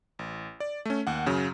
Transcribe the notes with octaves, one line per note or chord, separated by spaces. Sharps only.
A1
D5
A3 C#4
D#2 F#5
F#2 C#3 F#3